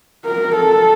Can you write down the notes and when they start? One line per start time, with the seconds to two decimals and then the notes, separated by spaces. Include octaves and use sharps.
0.25 A#4
0.55 A4